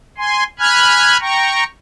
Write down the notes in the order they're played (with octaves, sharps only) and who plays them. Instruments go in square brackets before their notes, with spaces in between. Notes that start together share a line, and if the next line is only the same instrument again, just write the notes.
[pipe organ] G#5 C6
G#5 B5 F6 F#6 G#6
G5 A#5 C#6